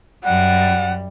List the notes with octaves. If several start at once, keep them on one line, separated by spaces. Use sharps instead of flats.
F#2 G3 F#5